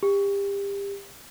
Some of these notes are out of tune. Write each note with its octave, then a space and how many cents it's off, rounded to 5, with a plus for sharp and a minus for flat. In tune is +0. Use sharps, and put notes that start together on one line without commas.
G4 +30